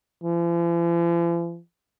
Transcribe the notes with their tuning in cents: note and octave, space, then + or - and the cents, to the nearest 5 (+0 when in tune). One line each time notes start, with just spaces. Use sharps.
F3 -45